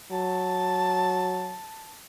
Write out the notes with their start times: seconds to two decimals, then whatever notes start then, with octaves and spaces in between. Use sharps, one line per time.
0.12 F#3 A5